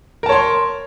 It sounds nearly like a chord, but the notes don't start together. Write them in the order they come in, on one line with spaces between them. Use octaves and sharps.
A#4 A5 C#5 C6